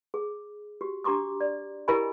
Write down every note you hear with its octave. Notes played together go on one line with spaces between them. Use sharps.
G#4
F#4 G4
D4 G4 A#5 C6 D6 D#6
D5
E4 G4 A#4 D#5 G#5 B5